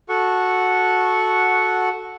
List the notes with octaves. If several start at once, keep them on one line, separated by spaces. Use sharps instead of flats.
F#4 A4 F#5 C#6